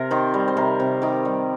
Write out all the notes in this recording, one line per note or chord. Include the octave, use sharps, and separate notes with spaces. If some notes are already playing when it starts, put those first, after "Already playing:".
Already playing: C3 A#4
D#3 C5
G3
C5
C3 A#4
C3
D#3 G4
G3